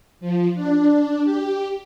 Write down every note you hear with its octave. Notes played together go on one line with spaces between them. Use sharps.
F3
D4
G4